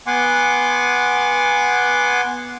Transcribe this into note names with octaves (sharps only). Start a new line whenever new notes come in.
B3 F#5 G#5 C6 D6